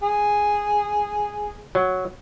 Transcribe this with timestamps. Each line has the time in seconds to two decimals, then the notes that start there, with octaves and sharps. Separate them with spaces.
0.02 G#4
1.75 F#3